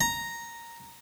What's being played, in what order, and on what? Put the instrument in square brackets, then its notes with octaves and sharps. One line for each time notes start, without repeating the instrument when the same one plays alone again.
[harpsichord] A#5